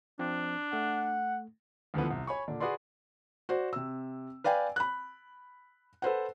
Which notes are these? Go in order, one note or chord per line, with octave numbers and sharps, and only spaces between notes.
F3 C4 D4
A3 F#5
D2 D3 E3 F3 B3
C2
C#5 G#5 B5 C#6
A#2 D3 D4
F#4 G#4 B4 D5 C6
F#4 C5 D5
C3 E6
B4 D5 F5 G5 G#5
B5 F#6
A4 B4 C5 F#5